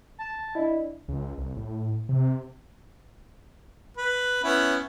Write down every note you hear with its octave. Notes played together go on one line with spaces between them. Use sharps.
A5
D4 E4 D5 D#5
C#2
C2
A2
C3
B4
B3 C#4 E4